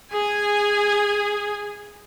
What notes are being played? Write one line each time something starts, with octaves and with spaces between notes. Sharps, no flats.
G#4 G#5